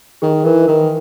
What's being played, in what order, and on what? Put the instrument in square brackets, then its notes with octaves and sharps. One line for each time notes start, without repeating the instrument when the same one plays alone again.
[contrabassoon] D#3 [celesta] G#4
[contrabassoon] E3 [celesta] A#4
[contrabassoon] D#3 [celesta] A#4